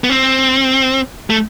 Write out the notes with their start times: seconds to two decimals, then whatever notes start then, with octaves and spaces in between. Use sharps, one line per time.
0.04 B3
0.10 C4
1.30 A3